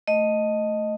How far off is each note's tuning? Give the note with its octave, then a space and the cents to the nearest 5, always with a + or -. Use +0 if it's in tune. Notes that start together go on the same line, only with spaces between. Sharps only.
A3 +0 D#5 +0